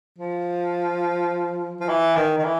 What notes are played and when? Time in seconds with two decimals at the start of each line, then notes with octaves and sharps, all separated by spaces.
0.18 F3
1.81 F3
1.89 E3
2.16 D#3
2.38 D#3
2.44 E3